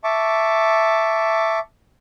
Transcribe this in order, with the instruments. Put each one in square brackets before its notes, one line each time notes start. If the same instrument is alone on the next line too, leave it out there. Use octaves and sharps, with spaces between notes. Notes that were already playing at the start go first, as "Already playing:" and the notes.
[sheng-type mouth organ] E5 A5 C#6 D6